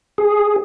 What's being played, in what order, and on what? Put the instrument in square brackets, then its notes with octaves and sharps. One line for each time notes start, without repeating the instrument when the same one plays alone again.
[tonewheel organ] G#4